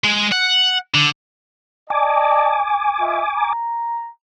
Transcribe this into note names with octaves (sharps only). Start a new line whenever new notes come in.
G#3
F#5
D3
D5 D#5 G#5 A5 D6
F4 D#5 E5
A#5